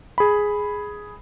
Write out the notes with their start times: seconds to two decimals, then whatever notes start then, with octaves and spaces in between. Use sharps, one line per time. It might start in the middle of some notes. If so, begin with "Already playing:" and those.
0.18 G#4 B5